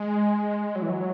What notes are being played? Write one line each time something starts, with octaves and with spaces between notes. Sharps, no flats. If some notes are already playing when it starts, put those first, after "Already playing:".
Already playing: G#3
F#3
E3
F#3